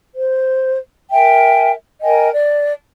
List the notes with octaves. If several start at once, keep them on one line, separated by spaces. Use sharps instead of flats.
C5
A#4 E5 G5 G#5
A#4 D#5 G5 G#5
D5